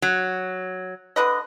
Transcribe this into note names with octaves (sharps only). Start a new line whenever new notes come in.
F#3
D3 B4 D#5